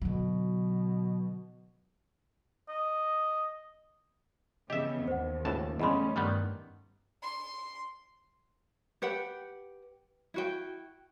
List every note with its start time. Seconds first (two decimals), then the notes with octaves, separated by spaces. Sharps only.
0.02 B2 D3 F#3
2.69 D#5
4.70 C#3 E3 B3 G4 D#5 E5
5.08 D#2 C5 F#5
5.45 C#2 A2 A5
5.80 E2 C#3 G3 A3 C#4 D#5 B5 C6
6.16 G2 D#3 G3 B3
7.22 C6
9.02 G4 B4 F#5 G5
10.34 E4 F#4 G5